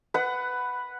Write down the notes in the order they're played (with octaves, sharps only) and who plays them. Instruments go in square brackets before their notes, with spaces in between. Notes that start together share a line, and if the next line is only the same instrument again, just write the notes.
[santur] B4 F#5